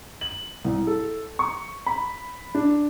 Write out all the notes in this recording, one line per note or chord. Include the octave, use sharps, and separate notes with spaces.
F#7
C2
A4
C#6
B5
D4